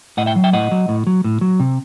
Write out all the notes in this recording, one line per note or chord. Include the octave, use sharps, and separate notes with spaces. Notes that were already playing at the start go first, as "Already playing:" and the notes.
A2 D#5 F#5
E5 G5
F#3
E5 G5
A2 D#5 F#5
F#3
A2
F#3
A2
F#3
C3